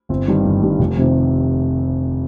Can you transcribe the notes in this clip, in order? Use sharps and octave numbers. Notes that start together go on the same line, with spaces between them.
G1 C4
G2 D#3 G3
G1
G2 D#3 G3
F1
F2 C3 D#3